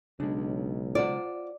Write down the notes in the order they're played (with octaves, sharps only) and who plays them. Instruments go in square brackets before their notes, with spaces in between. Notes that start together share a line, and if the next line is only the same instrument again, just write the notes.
[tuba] B1 [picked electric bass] C#3 G#3 [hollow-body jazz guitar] D4
[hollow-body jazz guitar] F4 C5 F#5 [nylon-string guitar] D5